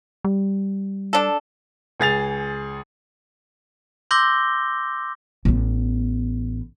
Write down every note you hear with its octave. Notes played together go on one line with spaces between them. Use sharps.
G3
D4 A4
C#2 G#4 A6 F7
C6 D6 E6 G6 A#6 G7
A1 B3